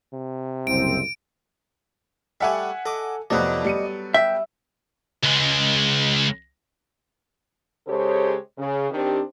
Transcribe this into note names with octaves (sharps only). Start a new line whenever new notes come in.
C3
F#1 C2 C4 D7
G3 A3 G4 E5 F#5 G#5
A4 D#5 D6
F2 C3 F3 F#3 B3 A4 D5 D#5
G3 C#7 D#7
E5 G5
C#2 G#3
C#3 G#3 G4 A4 C5 C#5
C#3
D#3 C4 D4 G4